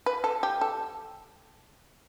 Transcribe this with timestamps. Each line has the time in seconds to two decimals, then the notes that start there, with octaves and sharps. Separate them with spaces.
0.06 B4
0.24 A4
0.43 G4
0.61 A4